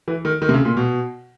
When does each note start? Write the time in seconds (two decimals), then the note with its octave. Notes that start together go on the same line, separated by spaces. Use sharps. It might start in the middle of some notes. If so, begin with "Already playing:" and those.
0.08 E3
0.25 D#3
0.42 D#3
0.49 C3
0.54 C#3
0.65 A#2
0.77 B2